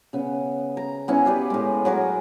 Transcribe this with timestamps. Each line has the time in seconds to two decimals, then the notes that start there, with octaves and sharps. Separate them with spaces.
0.13 C#3 B3
0.77 A#5
1.08 B3 C#4 E4
1.25 G4 B4 D5 F5
1.50 A2 G#3
1.85 F#3 F#4 G#4 A#4